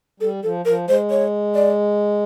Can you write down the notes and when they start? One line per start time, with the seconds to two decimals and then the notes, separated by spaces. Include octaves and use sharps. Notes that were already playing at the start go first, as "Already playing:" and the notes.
0.20 G3 A4
0.43 F3 A4
0.65 F3 A#4
0.88 G#3 C5
1.10 C#5
1.55 D5